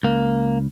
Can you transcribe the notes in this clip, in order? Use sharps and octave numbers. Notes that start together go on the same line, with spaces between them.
C#2 A#3